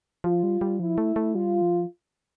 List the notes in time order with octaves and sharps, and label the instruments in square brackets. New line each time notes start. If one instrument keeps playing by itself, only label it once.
[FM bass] F3 [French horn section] F4
[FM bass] G3
G3
[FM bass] F3 [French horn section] E4
[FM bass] A3
A3
[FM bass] G3 [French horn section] F4
[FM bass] F3